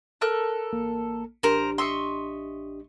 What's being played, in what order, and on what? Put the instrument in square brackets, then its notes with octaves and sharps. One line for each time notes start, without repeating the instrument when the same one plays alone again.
[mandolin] A4 A#4 F#6
[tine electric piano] A1 A#3
[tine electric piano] A1 D4 G4 [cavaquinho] A#4 C5
[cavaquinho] D#5 E5 [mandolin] C6 C#6